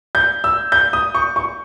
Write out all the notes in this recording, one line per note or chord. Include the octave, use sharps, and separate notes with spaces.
G6
E6
G6
D#6
C#6
C#6